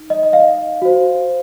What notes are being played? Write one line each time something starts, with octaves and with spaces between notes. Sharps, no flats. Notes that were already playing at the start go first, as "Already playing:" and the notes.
Already playing: D#4
D#5
D#5
F5
F#4 C5